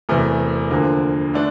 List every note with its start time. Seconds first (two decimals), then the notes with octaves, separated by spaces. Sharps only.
0.09 E1 E2 C3 E3 A3
0.71 D2 D3 F3 A#3
1.34 D3 A3 D4